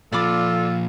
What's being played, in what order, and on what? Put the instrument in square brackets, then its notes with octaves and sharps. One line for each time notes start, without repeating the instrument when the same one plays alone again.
[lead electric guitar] A#2 F3 [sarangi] F4 [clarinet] A4 [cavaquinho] D5 B5 D6